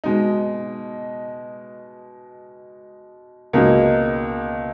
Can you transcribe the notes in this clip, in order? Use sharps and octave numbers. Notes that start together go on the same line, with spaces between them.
B2 G#3 D#4
C#2 B2 A#3 D#4